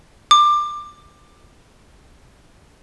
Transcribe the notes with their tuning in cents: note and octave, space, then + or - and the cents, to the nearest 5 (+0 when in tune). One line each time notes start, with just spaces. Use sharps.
D6 +20